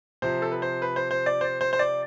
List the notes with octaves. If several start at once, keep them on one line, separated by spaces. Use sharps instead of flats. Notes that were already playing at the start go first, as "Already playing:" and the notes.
C3 F3 C5
A4
B4
C5
B4
C5
C5
D5
C5
C5
C5
D5